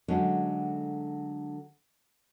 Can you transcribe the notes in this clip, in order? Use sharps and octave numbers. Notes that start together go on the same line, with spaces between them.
D3 F#3 G#3 A3 C#4